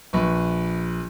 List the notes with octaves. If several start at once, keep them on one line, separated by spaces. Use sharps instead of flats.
A#1 B4 C#6